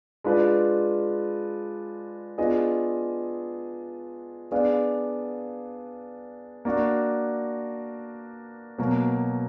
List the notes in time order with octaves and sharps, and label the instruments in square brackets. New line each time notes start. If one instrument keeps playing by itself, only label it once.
[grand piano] G#3 D4 F4 B4
B3 D4 F4 G#4 D#5
B3 D4 G#4 D5 F5
A#3 D4 F#4
B2 F#3 A#3